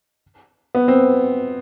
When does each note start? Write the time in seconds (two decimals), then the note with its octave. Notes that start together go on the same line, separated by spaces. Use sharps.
0.75 B3
0.88 C4